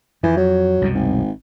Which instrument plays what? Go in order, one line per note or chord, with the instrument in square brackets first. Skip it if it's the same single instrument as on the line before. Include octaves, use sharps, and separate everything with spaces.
[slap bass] F2 [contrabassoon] E3
[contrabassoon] F#3
[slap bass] C2 F#2 B2
[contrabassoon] G#1